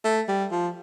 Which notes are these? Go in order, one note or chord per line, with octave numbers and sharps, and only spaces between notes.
A3
G3
F3